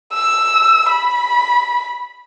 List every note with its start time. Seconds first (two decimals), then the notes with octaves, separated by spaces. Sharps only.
0.13 E6
0.91 B5